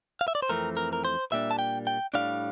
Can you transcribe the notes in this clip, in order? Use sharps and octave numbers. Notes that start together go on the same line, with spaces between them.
F5
E5
D5
C5
F2 E3 A3 C4 A#4
A#4
A#4
C5
A#2 G3 A#3 D4 E5
A5
G5
G5
A2 G3 D4 F5